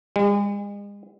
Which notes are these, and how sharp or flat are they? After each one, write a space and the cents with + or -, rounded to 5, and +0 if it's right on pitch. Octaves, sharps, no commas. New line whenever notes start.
G#3 -40